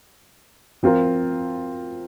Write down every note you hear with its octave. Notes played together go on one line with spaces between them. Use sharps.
F3 C4 F4 A#4